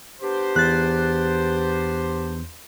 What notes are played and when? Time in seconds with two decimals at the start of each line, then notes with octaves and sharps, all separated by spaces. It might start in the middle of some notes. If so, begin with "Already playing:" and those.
0.21 B3 D4 G4 C5
0.56 E2 F#6 A6